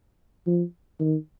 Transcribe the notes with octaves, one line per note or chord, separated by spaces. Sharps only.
F3
D#3